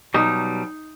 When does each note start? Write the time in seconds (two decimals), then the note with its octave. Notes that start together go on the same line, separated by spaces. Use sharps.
0.14 B2 F#3 G3 D#4